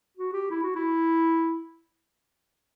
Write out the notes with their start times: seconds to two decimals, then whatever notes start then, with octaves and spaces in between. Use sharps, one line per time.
0.17 F#4
0.33 G4
0.51 E4
0.63 F#4
0.76 E4